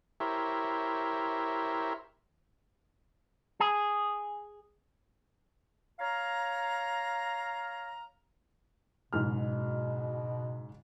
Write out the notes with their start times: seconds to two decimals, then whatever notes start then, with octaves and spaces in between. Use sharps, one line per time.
0.20 E4 G4 A#4 C5 C#5 E5
3.60 G#4
6.00 C#5 F5 A#5
9.13 F#1 G#2 B2 F6